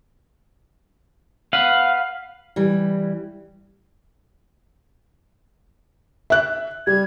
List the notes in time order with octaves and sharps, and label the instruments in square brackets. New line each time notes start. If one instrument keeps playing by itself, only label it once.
[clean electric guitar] B4 F#5 [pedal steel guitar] F5
[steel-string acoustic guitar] E3 G3
[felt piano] E5 F#6
[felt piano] G3 [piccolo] G#6